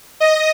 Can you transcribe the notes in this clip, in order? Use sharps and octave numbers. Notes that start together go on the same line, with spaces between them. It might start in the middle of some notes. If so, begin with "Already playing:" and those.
D#5